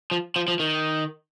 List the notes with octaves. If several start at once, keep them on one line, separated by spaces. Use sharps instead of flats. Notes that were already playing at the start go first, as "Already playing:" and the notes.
F3
F3
F3
D#3